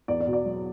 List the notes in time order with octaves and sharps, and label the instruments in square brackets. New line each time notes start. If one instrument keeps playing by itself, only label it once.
[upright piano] E2 D5
D5
B2
D5
F#3